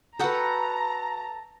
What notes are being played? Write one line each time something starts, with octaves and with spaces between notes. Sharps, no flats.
F#4 A4 B4 F#5 G5 A5 A#5